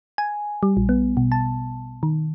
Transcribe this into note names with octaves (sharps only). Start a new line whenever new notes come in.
G#5
G3
A#1
B3
B2
A5
D#3